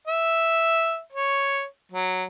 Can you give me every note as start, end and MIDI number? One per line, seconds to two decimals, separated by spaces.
0.07 1.00 76
1.12 1.64 73
1.92 2.24 54